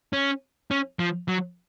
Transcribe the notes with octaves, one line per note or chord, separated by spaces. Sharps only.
C#4
C#4
F3
F#3